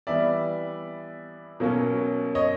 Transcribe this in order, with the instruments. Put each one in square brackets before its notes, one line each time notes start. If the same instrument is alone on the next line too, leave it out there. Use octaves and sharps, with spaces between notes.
[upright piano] E3 G3 B3 D5 E5
B2 F#3 A#3 C#4
C#5 D#5